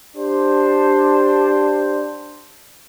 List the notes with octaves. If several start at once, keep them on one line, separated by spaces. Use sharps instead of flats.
D4 G4 C5